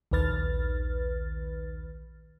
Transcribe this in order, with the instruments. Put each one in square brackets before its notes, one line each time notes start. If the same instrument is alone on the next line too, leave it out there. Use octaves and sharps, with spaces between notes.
[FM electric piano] A#1 D#2 D#3 B4 F6 A6